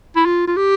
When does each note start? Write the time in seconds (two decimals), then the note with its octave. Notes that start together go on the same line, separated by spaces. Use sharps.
0.16 E4
0.26 F4
0.47 F4
0.56 G4